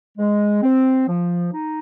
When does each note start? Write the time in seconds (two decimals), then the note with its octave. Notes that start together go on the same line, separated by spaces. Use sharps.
0.18 G#3
0.62 C4
1.08 F3
1.52 D#4